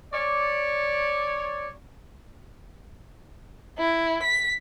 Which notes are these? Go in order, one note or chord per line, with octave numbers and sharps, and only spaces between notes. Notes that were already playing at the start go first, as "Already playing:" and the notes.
C#5 D5
E4
B6